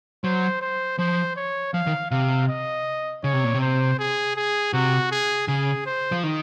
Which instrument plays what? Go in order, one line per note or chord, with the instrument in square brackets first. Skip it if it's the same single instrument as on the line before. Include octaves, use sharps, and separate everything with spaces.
[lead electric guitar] F#3 [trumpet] C5
[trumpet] C5
[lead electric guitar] F3 [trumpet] C5
[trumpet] C#5
[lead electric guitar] F3 [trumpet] F5
[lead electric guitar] D#3
[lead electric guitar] C3 [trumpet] F5
[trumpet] D#5
[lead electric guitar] C#3 [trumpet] C#5
[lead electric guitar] C3
A#2
C3
[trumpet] C5
G#4
G#4
[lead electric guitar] C3 [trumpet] F#4
[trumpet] G#4
[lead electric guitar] C#3 [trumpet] G#4
[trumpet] C5
[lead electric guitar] F3
D#3